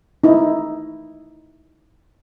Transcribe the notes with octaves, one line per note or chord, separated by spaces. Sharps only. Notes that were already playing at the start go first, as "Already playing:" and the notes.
D#4 E4